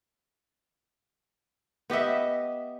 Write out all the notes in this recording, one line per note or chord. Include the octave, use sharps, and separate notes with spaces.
B3 G4 D#5 E5